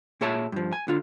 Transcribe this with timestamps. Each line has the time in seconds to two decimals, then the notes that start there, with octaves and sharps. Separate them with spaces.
0.21 A#2 G#4 C#5 E5 A5
0.52 G2 F3
0.73 G#5
0.88 D3 F4